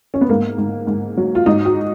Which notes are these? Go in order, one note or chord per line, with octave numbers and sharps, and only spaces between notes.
C#4
B3
G#2 A#3
G#2
G#2
F#3
F4
G#2 D#4
F#4